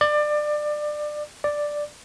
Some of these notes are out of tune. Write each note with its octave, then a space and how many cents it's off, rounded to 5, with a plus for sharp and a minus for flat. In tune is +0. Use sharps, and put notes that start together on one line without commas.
D5 +25
D5 +5